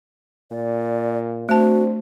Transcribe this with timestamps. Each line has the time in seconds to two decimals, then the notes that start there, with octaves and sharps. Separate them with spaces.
0.51 A#2 D5
1.49 A3 C4 D4 F#4 C5 A5